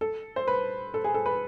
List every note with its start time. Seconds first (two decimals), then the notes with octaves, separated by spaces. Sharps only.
0.01 A4
0.36 C5
0.48 B4
0.94 A4
1.04 G#4
1.14 A4
1.26 B4